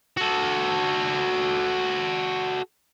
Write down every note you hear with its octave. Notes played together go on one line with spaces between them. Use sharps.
F#4 A4